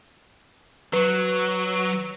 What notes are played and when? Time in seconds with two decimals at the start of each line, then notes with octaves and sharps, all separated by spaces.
0.93 F#3 B4